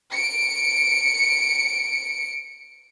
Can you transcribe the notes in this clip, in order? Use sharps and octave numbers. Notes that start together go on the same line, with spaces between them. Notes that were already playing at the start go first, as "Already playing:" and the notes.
C#7 D7